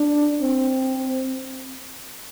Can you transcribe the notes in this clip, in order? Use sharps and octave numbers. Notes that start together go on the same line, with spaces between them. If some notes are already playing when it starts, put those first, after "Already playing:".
Already playing: D4
C4